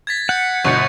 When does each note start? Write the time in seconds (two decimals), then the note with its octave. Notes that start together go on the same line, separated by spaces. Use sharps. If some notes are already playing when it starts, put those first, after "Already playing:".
0.07 G#6 A6 B6
0.29 F#5 G6 C#7
0.65 G1 B2 C#6 C#7